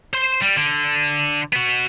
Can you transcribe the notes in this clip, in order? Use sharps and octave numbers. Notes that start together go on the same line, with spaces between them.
C5 C6
G3
D3
B3 F#4